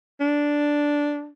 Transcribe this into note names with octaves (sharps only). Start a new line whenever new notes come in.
D4